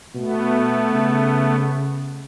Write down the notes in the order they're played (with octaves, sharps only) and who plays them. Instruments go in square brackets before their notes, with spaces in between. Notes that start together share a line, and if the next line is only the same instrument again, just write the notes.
[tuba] B2 [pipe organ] A3 B3
[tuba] C#3